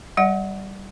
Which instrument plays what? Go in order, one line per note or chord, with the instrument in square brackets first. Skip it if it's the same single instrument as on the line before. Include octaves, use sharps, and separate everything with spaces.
[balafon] G3 D5 F#5